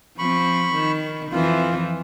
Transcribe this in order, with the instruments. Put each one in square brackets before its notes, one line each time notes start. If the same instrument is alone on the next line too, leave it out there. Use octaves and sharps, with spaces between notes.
[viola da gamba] F3 C4 [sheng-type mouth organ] B5 C#6
[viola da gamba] D#3
[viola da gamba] F2 E3 F3 [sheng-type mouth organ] F4